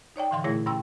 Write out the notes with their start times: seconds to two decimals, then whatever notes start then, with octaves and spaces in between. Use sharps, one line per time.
0.16 D#4 C#5 D5 G5
0.31 A2 D3 E3 F5 C6
0.44 A#2 A3 E4 G#4 C#5 A#6
0.66 G2 C#4 G5 C6 E6